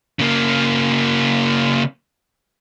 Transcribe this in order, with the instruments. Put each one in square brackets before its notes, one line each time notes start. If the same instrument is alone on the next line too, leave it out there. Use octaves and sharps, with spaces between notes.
[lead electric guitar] C#3 A#3